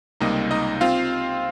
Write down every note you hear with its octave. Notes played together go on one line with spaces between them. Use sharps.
C#2 C3 G3 A#3 D#4 D#5
D#4 D#5
C4 F4 F5